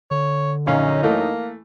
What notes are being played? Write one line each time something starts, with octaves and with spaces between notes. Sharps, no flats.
D3 C#5
A#1 F#2 C#4 D#4 F5
E3 A3 A#3